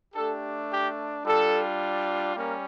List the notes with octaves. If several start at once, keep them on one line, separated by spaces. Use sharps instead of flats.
A3 D4 G4 A4
G4
G3 D4 F4 A4
G3 A#3 C#4 A#4